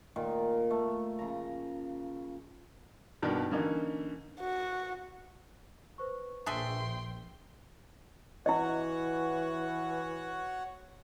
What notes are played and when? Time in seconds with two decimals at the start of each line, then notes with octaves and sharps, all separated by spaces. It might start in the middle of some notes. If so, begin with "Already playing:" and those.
0.16 A#2 D#3 F4
0.71 A3
1.19 C#3 F3 A#5
3.22 G2 B2 D#3 A#3 D4
3.51 D3 E3 A#3 C#4 D#4
4.40 F#4
5.98 B4 C5 C#6
6.46 A#1 D4 G#4 E5 G5 C6
8.46 E3 E4 F#4 C#5 D#5 F#5